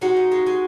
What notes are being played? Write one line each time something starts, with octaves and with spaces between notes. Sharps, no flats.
G#3 D#4 F#4
A#2
G#3
G#3